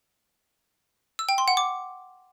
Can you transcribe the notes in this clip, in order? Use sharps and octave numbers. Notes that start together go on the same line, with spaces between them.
E6
G5
C6
F#5
D6